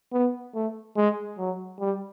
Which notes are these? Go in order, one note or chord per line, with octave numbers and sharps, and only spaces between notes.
B3
A3
G#3
F#3
G3